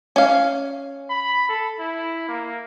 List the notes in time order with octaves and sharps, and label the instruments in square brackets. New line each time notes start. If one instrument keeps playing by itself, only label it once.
[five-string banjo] C#4 F5
[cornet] B5
A4
E4
A#3